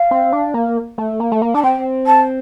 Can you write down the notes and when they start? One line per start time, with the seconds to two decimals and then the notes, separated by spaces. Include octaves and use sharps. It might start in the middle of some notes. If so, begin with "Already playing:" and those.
Already playing: F5
0.11 C4
0.33 D4
0.54 A#3
0.98 A3
1.20 A#3
1.32 A3
1.42 A#3
1.54 D4 A5
1.63 C4 G5
2.06 A5